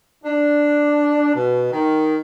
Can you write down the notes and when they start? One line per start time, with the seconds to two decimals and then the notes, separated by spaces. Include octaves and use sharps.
0.24 D4
1.34 B2
1.72 D#3